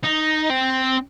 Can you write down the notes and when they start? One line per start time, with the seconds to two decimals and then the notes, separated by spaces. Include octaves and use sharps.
0.03 D#4
0.50 C4